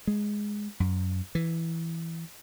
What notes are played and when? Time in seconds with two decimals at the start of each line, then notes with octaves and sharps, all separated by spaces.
0.07 G#3
0.80 F#2
1.35 E3